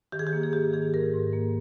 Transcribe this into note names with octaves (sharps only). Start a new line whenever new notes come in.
D#3 G4
G#4
G4
A#3
G#4
G#2 G4
D#3 G#4
G#2 A#4
G#2
A#3